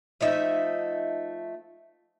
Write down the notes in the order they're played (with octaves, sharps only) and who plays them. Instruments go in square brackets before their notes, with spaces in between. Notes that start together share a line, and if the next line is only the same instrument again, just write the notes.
[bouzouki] F3 A3 D#4 E5